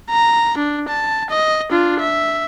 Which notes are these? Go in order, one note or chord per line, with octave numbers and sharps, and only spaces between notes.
A#5
D4
A5
D#5
D4 F4
E5